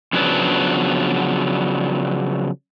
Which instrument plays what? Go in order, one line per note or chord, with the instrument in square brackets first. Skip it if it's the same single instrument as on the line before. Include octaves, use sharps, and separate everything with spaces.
[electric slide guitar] C#3 F3 F#3 B3 D4